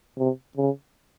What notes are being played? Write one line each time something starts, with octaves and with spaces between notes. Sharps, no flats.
C3
C#3